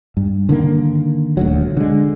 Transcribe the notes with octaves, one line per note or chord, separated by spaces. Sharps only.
G2
D3 D#3 A#3
D#1 D2 F#3
D3 G#3